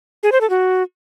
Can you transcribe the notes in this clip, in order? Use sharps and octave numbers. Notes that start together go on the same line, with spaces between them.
G#4
C5
A4
F#4